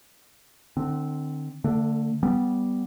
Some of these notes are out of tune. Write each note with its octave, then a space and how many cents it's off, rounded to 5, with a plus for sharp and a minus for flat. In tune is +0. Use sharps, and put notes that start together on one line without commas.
D3 +40 C4 +0
D3 +0 A3 +40
G3 -5 B3 +0